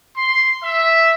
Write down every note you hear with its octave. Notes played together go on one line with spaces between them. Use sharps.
C6
E5